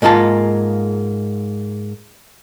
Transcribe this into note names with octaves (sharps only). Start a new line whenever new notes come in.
G#2 G#3 A#3 F4 A5